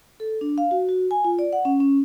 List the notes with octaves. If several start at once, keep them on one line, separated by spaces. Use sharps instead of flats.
A4
D4
F5
F#4
F#4
G#5
F4
D5
F#5
C#4
C#4